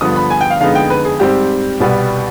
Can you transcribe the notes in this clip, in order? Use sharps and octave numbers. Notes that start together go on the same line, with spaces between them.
G2 D3 F3 B3 D#6
B5
G#5
G5
F5
F2 D3 G#3 B3 D#4 F5
G5
B4
G#4
G#2 G3 C4 G4
C2 B2 G3 B3